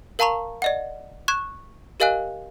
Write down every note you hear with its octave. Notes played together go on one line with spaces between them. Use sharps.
A#4 F5 A5 A#5 C#6 F7
D5 D#5 F#5
C#6 F#6 G#6 E7
G4 A#4 D#5 F5 G#5 F#6